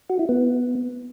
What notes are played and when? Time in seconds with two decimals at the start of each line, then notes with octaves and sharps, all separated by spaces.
0.10 F#4
0.19 E4
0.29 B3